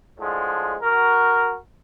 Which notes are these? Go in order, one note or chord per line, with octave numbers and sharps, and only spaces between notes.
A2 D3 F3 G#3
F#4 A#4